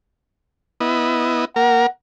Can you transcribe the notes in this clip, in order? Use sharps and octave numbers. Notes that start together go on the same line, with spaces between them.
B3 E4 D#5
A#3 A#4 F#5